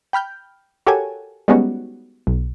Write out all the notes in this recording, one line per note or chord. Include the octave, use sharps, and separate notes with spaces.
G5 B5 F6 G6
F#4 G4 A4 A#4 C#5 G#5
G3 G#3 B3 C#4 D#4 F#4
B1